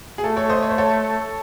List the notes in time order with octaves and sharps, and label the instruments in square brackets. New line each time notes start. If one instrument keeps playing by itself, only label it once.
[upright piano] G#4
[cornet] A3 [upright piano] A4
[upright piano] A4 C#5
C5 D#5
C#5
C5
A4 C#5